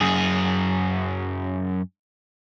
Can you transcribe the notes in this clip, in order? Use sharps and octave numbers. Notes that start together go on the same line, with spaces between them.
F#2 G#4